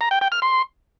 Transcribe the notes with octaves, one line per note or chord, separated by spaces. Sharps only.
A#5
G5
G5
F6
C6